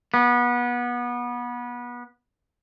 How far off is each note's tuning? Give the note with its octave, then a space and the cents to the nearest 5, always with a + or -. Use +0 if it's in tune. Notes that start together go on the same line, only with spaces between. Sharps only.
B3 -25